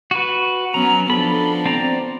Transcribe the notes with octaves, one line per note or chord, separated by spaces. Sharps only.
F#4 B4
F#3 B3 C#4 A#5
F3 B3 D4 A4 B5
C4 D5 A#5